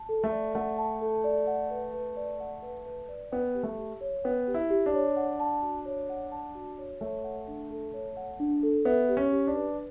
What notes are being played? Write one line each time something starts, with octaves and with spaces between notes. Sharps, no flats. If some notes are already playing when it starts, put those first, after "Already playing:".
Already playing: A5
A4
A3
D5
A3 F#5
A5
A4
D5
F#5
B4
B4
D5
F#5
B4
B4
D5
B3 G5
G4
A3
G4
C#5
B3 G5
G4
E4
G4
D4
C#5
F#5
A5
F#4
C#5
F#5
A5
F#4
C#5
A3 C#5
F#5
D4
A4
C#5
F#5
D4
A4
B3 E5
G4
C#4
G4
D4
B4